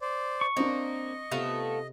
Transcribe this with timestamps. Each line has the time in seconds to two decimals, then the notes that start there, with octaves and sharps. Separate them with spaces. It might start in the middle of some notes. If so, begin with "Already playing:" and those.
0.01 C5 D5
0.41 C#6
0.57 A#3 C4 D4 D#5
1.31 C3 A3 B3 F4